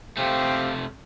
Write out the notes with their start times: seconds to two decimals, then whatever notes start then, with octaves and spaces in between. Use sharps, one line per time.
0.17 C3 A3 C4 G4 F5